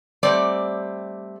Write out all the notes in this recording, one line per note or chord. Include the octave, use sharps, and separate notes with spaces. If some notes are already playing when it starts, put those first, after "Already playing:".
G3 A3 C4 D5